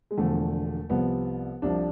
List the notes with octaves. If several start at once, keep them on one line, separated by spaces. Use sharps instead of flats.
G#3
E1 E2 D3 F3 A3
C2 C3 F3 B3
C2 C3 F3 D4